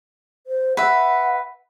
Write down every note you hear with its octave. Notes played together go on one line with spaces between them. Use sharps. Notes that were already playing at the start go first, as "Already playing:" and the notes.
C5
B4 E5 F#5